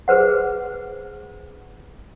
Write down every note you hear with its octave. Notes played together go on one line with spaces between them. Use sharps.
G#4 B4 C5 F#5